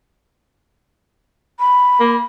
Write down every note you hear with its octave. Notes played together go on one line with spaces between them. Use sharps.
B5
A#3